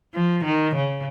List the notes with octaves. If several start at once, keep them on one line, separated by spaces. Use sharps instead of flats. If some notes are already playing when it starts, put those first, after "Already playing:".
F3
D#3
C#3